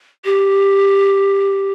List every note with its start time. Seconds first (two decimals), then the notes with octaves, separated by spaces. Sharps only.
0.25 G4